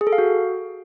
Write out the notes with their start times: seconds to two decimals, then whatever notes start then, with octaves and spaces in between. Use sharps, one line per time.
0.01 G#4
0.07 A4
0.13 F5
0.18 F#4